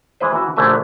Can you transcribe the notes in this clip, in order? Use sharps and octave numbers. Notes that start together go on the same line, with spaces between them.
E3 G#3 E4 B4 C5
E3 F#4
A#1 D3 F#3 A3 E5 G#5